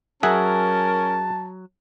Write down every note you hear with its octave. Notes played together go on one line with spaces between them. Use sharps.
F#3 C#4 G#4 A#4 E5 F#5 A5